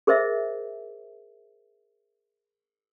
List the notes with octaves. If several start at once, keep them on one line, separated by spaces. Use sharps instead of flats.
G#4 A#4 C5 D#5 E5